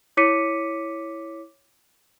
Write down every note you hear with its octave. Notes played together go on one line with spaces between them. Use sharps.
E4 C#5 D6 B6 C#7 D#7